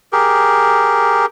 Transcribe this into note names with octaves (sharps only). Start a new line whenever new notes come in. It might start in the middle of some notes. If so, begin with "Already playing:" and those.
G4 G#4 A#4